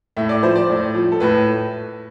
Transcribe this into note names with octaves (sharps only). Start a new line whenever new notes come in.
A2 E5
D5
F3 C5
D5
A2
F3
A4
A2 B4